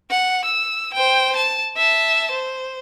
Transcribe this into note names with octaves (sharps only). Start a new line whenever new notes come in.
F#5
E6
C5 G5
A5
E5 A5
C5